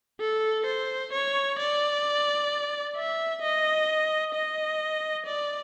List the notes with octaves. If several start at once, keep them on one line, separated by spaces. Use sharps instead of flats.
A4
C5
C#5
D5
E5
D#5
D#5
D5